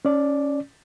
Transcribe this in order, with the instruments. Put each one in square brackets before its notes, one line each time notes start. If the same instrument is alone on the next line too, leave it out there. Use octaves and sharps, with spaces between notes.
[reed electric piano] C#4 D5